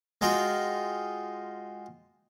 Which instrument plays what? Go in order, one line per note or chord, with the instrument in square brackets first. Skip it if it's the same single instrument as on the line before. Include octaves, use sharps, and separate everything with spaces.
[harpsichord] G#3 D#4 F4 F#4 G5